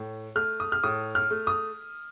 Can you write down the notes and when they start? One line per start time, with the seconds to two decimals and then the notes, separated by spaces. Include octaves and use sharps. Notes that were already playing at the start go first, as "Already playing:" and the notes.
Already playing: A2
0.36 A3 F6
0.60 D#6
0.72 F6
0.83 A2 D#6
1.15 F6
1.30 A3
1.47 D#6